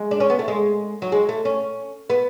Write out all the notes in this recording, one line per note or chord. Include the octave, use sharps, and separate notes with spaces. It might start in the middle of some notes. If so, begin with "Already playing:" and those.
Already playing: G#3
D4
C#4
B3
A3
G#3
F#3
G#3
A3
C#4
B3